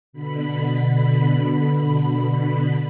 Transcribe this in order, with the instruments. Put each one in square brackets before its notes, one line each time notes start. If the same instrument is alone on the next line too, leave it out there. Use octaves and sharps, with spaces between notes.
[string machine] B2 D3 B5